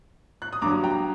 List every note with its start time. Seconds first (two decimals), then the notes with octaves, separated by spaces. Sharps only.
0.42 F#6
0.53 D#6
0.62 G2 A#5 D6
0.65 F#3
0.84 G5 A#5